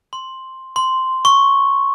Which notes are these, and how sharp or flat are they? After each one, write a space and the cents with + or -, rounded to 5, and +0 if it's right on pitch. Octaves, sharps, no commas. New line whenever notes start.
C6 +5
C6 -5
C#6 -5